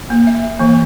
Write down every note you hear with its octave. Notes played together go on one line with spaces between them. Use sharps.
A#3
E5
E3 A#3